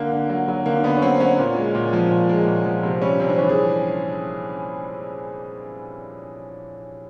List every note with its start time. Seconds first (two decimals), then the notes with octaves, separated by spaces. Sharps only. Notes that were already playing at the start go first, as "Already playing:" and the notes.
Already playing: D3 A#3
0.12 D3
0.29 F#3
0.48 F#3
0.66 D3 A#3
0.84 D3 B3
0.97 C#4
1.02 F#3 C4
1.20 F#3 C#4
1.38 A#2
1.57 G#3
1.75 A#2
1.93 F3
2.11 A#2
2.29 G#3
2.47 A#2
2.65 F3
2.83 C3 C4
3.02 G3 C#4
3.20 C3 C4
3.29 D4
3.38 E3 C#4
3.49 G#4